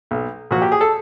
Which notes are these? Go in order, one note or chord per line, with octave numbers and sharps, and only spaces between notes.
B1
A#2 F3 F#4
G4
G#4
A4